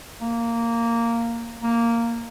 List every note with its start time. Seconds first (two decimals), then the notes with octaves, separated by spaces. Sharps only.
0.22 A#3
1.63 A#3